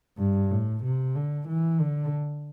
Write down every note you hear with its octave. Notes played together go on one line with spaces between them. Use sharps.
G2
A2
C3
D3
E3
D3